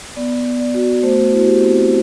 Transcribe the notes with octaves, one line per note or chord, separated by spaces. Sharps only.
B3 D5
B3
D5
F#4
A3 C5
E4 F#4
G4
C4